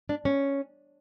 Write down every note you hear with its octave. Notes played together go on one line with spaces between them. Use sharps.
D4
C#4